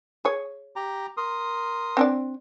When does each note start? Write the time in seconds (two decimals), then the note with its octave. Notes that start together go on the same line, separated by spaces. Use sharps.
0.25 G#4 C#5
0.76 G4 A#5
1.17 A#4 C6 D#6
1.97 C4 D4 D5